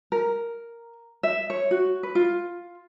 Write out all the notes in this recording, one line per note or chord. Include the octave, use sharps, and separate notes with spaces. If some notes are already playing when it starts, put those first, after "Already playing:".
A#4
E5
C#5
F#4
B4
F4